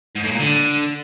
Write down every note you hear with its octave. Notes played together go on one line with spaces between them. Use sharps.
G#2
A2
A#2
D3